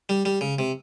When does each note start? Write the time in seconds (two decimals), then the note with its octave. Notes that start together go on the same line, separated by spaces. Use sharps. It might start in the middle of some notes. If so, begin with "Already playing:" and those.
0.09 G3
0.25 G3
0.41 C#3
0.59 C3